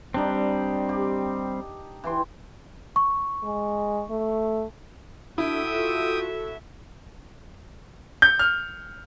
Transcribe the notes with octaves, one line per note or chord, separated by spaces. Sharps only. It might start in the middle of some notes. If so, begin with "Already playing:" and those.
G3 C4 D4 D#4
G4
E3 G5 C6
C#6
G#3
A3
D4 E4 F#4 A4 E5 G5 D#6
F4
G6
F6